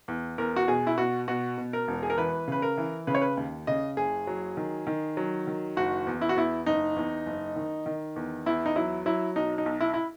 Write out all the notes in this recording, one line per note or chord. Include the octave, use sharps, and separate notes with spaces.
E2
E2 A#4
F#4
B2 G#4
E4
B2 F#4
B2 F#4
B2
A#4
E1
G#4
A#4
E3 B4
C#3 B4
A#4
E3
C#3 B4
C#5
B4
D#2
C#3 D#5
F#1 G#4
F#3
D#3
D#3
F#3
D#3
F#1 F#4
E2
E4
F#4
E2 E4
F#1 D#4
E2
F#1
D#3
D#3
E2
E2 E4
D#4
F#3 E4
F#3 E4
B1 D#4
D#4
B1
E4
E4